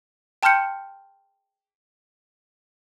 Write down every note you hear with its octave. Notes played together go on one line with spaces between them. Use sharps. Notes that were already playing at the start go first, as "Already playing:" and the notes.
G5 A5 C6 F6 G6 C#7